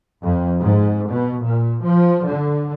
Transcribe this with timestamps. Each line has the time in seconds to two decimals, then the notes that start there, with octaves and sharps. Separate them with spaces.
0.23 F2
0.63 G#2
1.12 B2
1.45 A#2
1.84 F3
2.27 D3